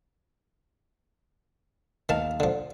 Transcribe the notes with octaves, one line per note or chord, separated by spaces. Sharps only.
D#2 D#3 F5 A5
D3 F3